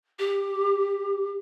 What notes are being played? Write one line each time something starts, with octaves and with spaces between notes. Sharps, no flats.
G4